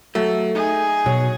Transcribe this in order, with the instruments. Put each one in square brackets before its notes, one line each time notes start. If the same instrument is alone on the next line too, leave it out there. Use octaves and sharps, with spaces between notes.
[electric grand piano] F#3 [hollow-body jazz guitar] A3
[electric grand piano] D#4 [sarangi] G#4
[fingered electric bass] B2 [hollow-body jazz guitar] F#3